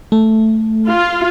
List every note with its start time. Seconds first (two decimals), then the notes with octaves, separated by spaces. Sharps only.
0.12 A3
0.88 F4